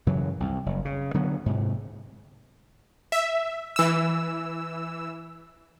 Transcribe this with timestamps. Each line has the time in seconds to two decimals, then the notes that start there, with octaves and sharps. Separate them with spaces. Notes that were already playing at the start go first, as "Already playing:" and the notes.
0.06 F#2 C#3 E3 F#3
0.40 C2
0.66 F#1
0.85 C#3
1.14 D3 F#3 B3
1.46 G#2 C3
3.12 E5
3.76 E3 E6